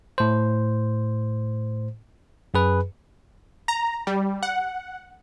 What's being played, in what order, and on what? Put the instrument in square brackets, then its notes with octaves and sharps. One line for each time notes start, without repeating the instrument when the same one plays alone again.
[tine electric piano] A2 C5
F#2 G#4 B4
[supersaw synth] A#5
G3
F#5